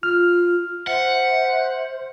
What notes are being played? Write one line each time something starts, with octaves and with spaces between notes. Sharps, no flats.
F4 F6
C5 E5 F#5